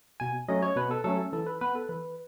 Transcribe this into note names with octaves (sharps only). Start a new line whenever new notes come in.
B2 G#5
F#3 A3 C#4 D#5
C#5
B2 B4
A4
F#3 A3 C#4 A4
E3 A4
B4
B3 B4
A4
E3 B4